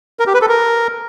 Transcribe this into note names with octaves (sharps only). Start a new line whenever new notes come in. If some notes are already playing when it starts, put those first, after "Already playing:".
A#4
G4
B4
A4
A#4